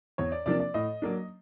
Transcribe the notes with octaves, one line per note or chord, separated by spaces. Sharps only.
E2 C#5
D5
C3 F3 A#3 D4 D5
D5
A2 D#5
F#3 A#3 D4